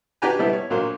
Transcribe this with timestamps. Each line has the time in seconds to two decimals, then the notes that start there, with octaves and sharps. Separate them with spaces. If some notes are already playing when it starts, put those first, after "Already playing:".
0.22 D4 F#4 G4 B4 G#5 A#5
0.39 B2 G3 B3 E4 A4
0.53 C#5
0.70 A#1 F#3 A#3 C5